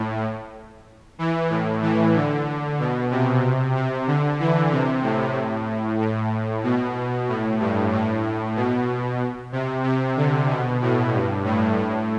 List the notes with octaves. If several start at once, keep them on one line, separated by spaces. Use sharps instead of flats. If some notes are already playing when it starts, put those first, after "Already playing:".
Already playing: A2
E3
A2
E3
D3
B2
C3
C3
D3
E3
C3
A2
A2
B2
A2
G2
A2
B2
C3
C3
D3
B2
A2
G2
A2
A2